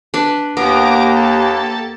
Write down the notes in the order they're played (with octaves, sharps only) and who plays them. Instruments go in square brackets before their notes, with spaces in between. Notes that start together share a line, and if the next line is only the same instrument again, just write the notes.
[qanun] D4 B4
[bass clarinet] D#2 [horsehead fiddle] A#3 G4 [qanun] B3 [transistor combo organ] A#4 D6
[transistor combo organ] A4